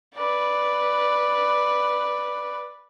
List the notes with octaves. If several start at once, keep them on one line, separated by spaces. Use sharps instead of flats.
B4 D5